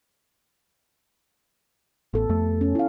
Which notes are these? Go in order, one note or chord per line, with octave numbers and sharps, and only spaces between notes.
A1 B3 A4
F2 A3
C#4
E4 F5